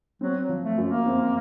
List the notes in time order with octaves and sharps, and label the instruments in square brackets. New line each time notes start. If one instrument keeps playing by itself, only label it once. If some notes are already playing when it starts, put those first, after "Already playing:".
[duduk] F#3 [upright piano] C4
[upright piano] F3
[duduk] A3
[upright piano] F#2
[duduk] A#3
[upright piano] C4